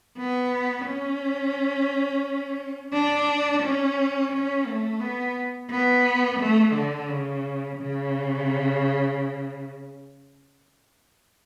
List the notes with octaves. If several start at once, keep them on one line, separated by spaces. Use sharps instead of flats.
B3
C#4
D4
C#4
C#4
A3
B3
B3
A3
D3
C#3
C#3